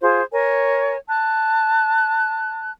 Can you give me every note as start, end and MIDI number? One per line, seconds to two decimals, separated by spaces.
0.01 0.22 65
0.01 0.22 68
0.01 0.22 72
0.32 0.97 70
0.32 0.97 73
0.32 0.97 80
1.08 2.71 81
1.08 2.71 90